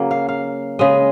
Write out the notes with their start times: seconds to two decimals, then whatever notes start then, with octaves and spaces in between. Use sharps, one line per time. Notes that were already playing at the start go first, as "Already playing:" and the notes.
Already playing: C#3 F#3 A#3
0.11 F5
0.29 F5
0.79 C#3 G#3 D#5